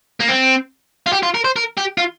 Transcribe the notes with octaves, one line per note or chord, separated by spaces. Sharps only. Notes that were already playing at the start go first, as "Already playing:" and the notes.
A#3
C4
F4
G4
F4
A#4
C5
A#4
G4
F4